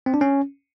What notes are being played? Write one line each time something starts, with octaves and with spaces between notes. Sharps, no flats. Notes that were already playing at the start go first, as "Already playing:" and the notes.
C4
D4
C#4